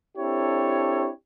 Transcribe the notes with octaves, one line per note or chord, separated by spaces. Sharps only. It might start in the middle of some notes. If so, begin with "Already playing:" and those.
C4 D4 E4 G4 A4 C#5